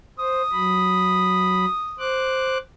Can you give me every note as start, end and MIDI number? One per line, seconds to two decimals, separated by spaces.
0.19 0.42 72
0.19 2.09 87
0.52 1.65 54
0.52 1.65 83
1.99 2.58 72
1.99 2.58 86
1.99 2.58 90